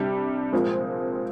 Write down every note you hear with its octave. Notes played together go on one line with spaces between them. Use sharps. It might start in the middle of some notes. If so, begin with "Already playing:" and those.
Already playing: C3 G3 D4 G4
A#2 F3 G#3 C4